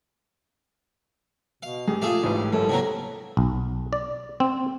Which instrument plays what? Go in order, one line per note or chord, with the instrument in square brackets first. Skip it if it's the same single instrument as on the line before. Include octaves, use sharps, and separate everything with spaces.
[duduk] B2 [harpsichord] F5
[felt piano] G2 [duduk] G4 [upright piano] G#4
[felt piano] A#2 [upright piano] A3 F4 [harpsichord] G#4 A4 F5
[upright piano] A1 G#2 B4 [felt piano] A3
[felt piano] G1 E4 [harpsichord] F#2 [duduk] A4
[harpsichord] C3 F#3 A#3 [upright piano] B3 A#5
[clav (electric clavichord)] B1
D5
C4